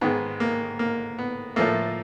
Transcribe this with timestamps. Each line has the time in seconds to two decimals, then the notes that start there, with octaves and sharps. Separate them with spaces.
0.01 G#2 D#3 G#3 B3
0.40 A#3
0.79 A#3
1.19 B3
1.56 A2 F3 A3 A#3